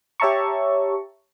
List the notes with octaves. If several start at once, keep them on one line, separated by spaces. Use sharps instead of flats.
G4 C#5 E5 A5 A#5 C#6